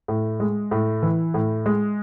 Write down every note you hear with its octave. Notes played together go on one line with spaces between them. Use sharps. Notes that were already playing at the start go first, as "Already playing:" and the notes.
A2
G#3
A2
E3
A2
G#3